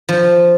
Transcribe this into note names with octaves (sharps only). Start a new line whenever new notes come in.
F3